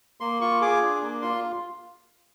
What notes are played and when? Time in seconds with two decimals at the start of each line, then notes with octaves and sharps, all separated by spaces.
0.21 A#3 C6
0.41 F4 C#6
0.61 G#4 D6
0.82 D4
1.02 A#3
1.22 F4 C6